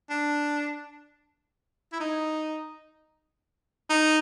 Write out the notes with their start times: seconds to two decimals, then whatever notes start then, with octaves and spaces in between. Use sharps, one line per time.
0.10 D4
1.93 E4
2.00 D#4
3.90 D#4